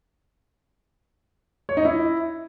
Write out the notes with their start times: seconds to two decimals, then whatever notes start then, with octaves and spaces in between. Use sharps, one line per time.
1.69 C#5
1.77 D#4
1.85 E4